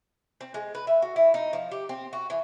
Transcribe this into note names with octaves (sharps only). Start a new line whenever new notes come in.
C4
G#3
B4
E5
F#4
E4
D#4
F3
G4
C4
F#4
E3